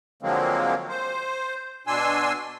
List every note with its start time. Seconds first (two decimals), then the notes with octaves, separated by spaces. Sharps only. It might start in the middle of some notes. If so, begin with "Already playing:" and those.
0.22 D3 F3 F#3 G#3 A#3 C4
0.89 C5
1.87 B2 D4 G#5 C6 E6